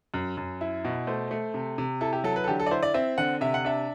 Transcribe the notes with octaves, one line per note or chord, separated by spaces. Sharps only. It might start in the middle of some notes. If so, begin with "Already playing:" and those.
F#2
F#2
E4
B2
A3 C5
A3
C3
C3
E4 A4
G4
F#3 A4
B4
A4
D3 G4
A4
D5
E4 C5
D5
C4 E5
D3 F#5
C3 E5
F#5
D4 E5